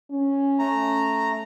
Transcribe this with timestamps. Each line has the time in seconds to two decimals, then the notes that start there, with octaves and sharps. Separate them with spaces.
0.11 C#4
0.59 A3 A#5